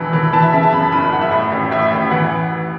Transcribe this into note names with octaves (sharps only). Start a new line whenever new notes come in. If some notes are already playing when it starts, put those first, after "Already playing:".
Already playing: E1 E3 B5
E3
B5
E3 A5
E5
C#3 E5
A5
F#2 B5
F#1 B5
F#1 F#5
E5
A2
A1
A2 E5
A1
E3 F#5